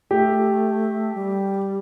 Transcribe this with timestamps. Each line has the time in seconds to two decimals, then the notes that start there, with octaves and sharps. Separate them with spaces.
0.11 A3 G4
1.15 G3